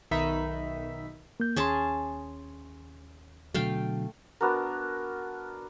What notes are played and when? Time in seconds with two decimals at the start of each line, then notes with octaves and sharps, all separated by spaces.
0.11 B1 D#3 D#4 E5 B5 B6
1.40 A#3 G6
1.56 D#2 C#4 G#4 A5 C6
3.54 B2 D3 F#3 A3 F5 G5
4.41 B3 D4 F#4 A#4